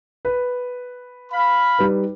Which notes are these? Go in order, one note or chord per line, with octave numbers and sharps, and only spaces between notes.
B4
F5 B5
G3 D#4 B4